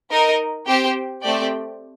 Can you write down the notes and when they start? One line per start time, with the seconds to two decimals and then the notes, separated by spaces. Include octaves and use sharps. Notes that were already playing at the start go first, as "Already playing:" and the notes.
0.10 D#4 A#4 D#5
0.66 C4 G4 C5 G5
1.23 A3 C4 G4 D5 G5